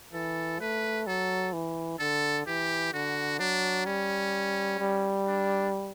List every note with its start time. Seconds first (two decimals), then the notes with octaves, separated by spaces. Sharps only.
0.13 E3 A4
0.60 A3 B4
1.07 F#3 A4
1.53 E3
2.00 D3 A4
2.47 E3 G4
2.93 D3 F#4
3.39 F#3 D4
3.86 G3 C#4
4.79 G3
5.26 D4